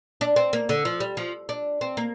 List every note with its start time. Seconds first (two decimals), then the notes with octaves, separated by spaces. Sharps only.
0.21 D4
0.36 C4
0.53 A#3
0.69 D3
0.85 F3
1.00 G3
1.17 F3
1.49 D4
1.81 C4
1.97 A#3